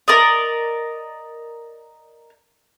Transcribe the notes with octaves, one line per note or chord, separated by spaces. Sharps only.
A#4 D5 D#5